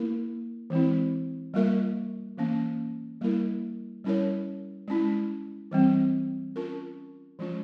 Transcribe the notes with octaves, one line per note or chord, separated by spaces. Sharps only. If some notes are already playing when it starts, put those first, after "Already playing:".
Already playing: A#3 E4 A#4
E3 G#3 C4 E4
G3 A#3 F4 A#4 E5
E3 A#3 C#4
G3 A#3 E4 A#4
G3 C#4 E4 A#4 C#5
G#3 C#4 E4
E3 G3 C4
C#4 F4 A#4
F3 G#3 C#4 F4